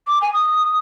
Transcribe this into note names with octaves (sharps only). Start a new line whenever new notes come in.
D6
G#5
D#6